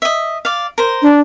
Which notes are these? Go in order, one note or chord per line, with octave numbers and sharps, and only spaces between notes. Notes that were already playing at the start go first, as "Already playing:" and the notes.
D#5 E5
D5 F5
A#4 C5
D4